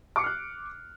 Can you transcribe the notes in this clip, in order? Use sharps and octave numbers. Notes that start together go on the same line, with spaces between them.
D6 F6 F#6 C7 C#7